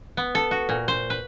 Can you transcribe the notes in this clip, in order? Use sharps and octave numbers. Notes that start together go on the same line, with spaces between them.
B3
A4
F#4
A#2
C5
B4